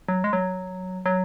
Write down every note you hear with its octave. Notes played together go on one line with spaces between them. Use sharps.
F#3
G#3
F#3
F#3